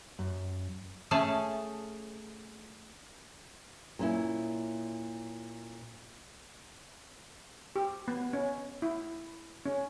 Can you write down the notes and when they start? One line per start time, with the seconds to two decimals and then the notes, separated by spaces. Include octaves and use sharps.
0.19 F#2
1.11 A3 C#4 G#4 A5
3.99 A#2 C#4 E4
7.76 G4
8.08 B3
8.33 C#4
8.82 E4
9.66 C#4